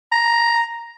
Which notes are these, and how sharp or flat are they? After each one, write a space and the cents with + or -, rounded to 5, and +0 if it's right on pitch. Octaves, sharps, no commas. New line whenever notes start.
A#5 +5